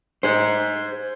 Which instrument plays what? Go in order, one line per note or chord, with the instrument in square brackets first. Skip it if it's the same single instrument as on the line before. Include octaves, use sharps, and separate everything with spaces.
[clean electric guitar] G#4 C5